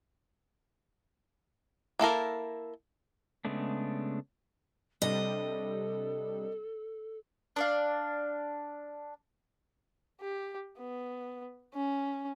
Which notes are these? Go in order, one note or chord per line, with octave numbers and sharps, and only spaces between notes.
A#3 E4 A4 A#4
C#3 G#3 A3 B3 D4
C3 G3 D4 A4 D#5
D4 D5 F5
G4
B3
C#4